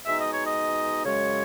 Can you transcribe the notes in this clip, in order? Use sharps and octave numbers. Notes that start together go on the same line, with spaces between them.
B2 G#3 D#4 E5
D#5
C#5
D#5
F#2 C#3 G#3 C#5